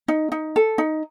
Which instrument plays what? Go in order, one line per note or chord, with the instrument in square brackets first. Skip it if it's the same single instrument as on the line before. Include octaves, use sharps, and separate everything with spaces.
[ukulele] D#4
D#4
A4
D#4